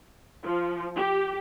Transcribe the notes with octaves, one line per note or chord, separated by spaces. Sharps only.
F3
G4